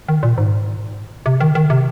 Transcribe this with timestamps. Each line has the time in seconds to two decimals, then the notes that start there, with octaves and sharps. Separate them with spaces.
0.09 D#3
0.23 A#2
0.38 G#2
1.26 C3
1.40 D#3
1.55 D#3
1.70 C3